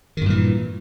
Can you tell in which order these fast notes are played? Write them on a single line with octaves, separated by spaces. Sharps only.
D#3 G2 A#2 E3